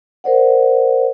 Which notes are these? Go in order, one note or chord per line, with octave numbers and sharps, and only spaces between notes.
A#4 C5 D5 F#5